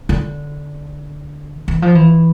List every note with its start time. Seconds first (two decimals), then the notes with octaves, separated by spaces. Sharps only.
0.09 D3
1.68 E3
1.82 F3
1.95 E3